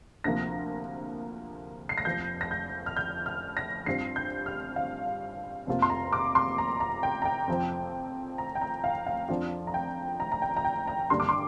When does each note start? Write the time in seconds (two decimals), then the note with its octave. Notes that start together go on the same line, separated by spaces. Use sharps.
0.24 D2 C3 F3 A#3 A#6
1.89 C7
1.98 A#6
2.05 F1 F2 F3 G6
2.41 A#6
2.51 G6
2.86 F6
2.97 G6
3.26 F6
3.57 A#6
3.86 G2 G3 C4 F4 C7
4.16 G6
4.46 F6
4.76 F5
5.67 F1 F2 C3 A#3 F4
5.82 C6
5.90 A#5
6.13 D6
6.35 C6
6.58 A#5
6.80 A#5
7.03 G5
7.22 A#5
7.25 G5
7.48 F2 F3 C4 F4
8.38 A#5
8.55 G5
8.61 A#5
8.84 F5
9.07 F5
9.28 F2 F3 D4 F4
9.67 A#5
9.74 G5
10.20 A#5
10.32 A#5
10.42 G5
10.56 A#5
10.65 G5
10.87 A#5
11.10 G2 D3 G3 A#3 D4 C6
11.20 D6
11.29 C6